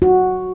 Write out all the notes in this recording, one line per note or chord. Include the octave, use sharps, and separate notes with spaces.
F#4